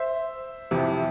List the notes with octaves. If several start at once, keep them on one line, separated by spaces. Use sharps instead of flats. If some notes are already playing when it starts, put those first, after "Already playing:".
Already playing: C5 E5
F2 C3 E3